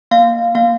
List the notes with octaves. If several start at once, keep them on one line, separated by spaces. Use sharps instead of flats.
A#3 F5
A#3 F5